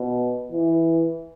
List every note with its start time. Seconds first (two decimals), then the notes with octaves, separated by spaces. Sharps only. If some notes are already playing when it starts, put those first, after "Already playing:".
Already playing: B2
0.52 E3